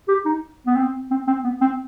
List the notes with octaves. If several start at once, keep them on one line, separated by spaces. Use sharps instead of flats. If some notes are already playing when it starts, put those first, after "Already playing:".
G4
D#4
B3
C4
C4
C4
B3
C4